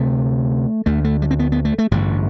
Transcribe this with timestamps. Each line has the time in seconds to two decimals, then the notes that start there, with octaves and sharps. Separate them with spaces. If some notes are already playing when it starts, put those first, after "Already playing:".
Already playing: D2 C3 A3
0.86 D2 D3 A3
1.04 A3
1.22 G3
1.31 C4
1.39 B3
1.52 B3
1.65 A3
1.78 A3
1.91 A1 G2 D3 G3